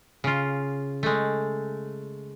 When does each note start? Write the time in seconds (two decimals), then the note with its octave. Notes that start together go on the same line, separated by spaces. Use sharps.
0.24 C#3 F4
1.03 G#3 A3